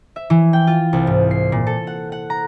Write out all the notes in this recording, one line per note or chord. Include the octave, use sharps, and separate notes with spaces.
E5
E3
G5
F4
C2
G#2
C7
A#2
A4
F#5
F#5
A#5